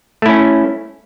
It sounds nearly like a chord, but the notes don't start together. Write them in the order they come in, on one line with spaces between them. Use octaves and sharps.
A3 E4 C#4